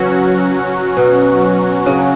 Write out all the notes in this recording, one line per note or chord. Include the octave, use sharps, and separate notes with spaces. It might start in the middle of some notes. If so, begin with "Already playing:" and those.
Already playing: C#3 E3 F#3 C#4 F#4
B2
C#3